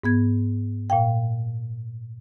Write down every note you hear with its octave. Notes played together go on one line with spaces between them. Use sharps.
G#2 B3 G#6
A#2 F5 G5